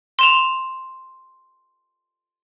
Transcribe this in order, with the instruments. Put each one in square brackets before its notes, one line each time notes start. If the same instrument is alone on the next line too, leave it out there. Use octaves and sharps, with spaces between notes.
[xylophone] C6 E7 F7